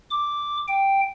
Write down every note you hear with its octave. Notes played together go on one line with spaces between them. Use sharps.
D6
G5